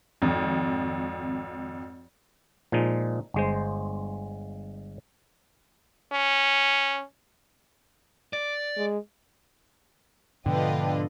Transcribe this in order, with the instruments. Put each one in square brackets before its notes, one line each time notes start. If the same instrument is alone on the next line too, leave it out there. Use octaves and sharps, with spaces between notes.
[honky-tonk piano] G#1 F2
[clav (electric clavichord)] A#2 F3 G#3 D#4
G1 G#3 C5
[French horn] C#4
[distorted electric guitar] D5
[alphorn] G#3
[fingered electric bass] G#2 B2 F3 [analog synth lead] D3 [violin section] F4 B4 D#5 [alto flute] G5